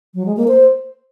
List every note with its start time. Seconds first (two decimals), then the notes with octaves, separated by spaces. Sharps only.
0.15 F#3
0.26 G#3
0.37 A#3
0.48 C5